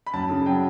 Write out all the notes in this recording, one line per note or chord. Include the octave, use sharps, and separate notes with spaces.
B5
F#2 A5
C#3
F#3 G5